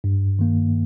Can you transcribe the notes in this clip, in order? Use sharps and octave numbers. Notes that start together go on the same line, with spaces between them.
G2
D#3 A#3